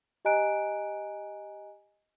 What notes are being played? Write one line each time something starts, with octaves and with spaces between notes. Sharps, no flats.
G4 D#5 G#5 A#5 F#6 D7